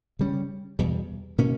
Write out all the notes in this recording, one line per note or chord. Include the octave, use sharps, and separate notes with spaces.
C#3 G3 C#4
E2 B2 G3
B2 A#3 C#4